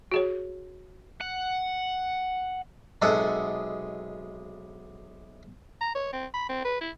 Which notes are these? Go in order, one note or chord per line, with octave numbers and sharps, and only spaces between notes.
F#4 G#4 C#5
F#5
B1 C3 G#3 A4 F#5
A#5
C#5
C4
B5
C4
B4
E4